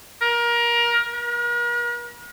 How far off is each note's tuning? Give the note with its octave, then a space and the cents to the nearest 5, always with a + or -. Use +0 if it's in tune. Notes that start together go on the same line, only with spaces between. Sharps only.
A#4 +25
A#4 +45